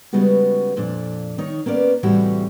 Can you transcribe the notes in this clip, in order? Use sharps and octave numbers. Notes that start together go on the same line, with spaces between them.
C#3 G3 G#3 B3 F#4
F2 A#2 D4
D#3 D#4 C#5
A#3 B3 C#4 D5
A2 C3 E3 G3 E4 F#4